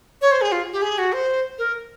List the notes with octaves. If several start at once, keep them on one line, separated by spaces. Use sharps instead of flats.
C#5
C5
G#4
F4
G4
G#4
F#4
C5
A#4